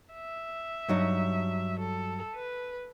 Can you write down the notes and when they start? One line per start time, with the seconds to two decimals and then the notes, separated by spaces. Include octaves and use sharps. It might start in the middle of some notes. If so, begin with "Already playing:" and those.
0.14 E5
0.89 G2 F#3 D#4
1.79 A4
2.36 B4